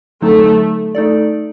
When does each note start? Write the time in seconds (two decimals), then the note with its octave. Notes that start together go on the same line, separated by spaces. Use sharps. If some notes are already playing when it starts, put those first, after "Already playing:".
0.22 D3 F#3 A3 C4 D#4
0.95 A3 D#4 A4 D5